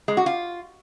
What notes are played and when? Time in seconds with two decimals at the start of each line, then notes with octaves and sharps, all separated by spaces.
0.08 G#3
0.17 F#4
0.26 F4